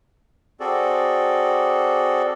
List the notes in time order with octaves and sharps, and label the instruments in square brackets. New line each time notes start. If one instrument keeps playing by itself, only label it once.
[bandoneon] C4 F#4 G#4 A4 D5